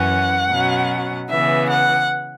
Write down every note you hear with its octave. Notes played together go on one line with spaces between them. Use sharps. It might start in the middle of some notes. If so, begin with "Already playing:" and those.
Already playing: F#2 E3 C#4 F#5
B2 F#3 C#4
C#3 E3 B3 E5
F#5